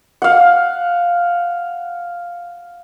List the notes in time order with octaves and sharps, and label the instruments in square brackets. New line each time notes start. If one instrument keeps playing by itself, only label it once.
[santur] F5 F#5